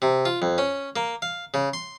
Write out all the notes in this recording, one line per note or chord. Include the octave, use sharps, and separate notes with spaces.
C3
F4
F2
C#4
A#3
F5
C#3
C6